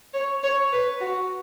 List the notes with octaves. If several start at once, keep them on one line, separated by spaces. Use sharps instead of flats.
C#5
C#5
B4
F#4